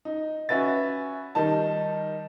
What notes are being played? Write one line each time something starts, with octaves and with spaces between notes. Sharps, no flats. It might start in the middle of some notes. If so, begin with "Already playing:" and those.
D#4
C#4 F#4 B4 E5 A6
D#3 G3 D#4 A5